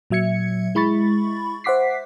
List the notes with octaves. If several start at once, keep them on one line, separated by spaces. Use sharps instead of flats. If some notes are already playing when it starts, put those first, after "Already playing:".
A#2 F#3 E5 G#6 C#7
G#3 E4 B5 C#6 A6
C5 E5 F#5 D6 B6 C7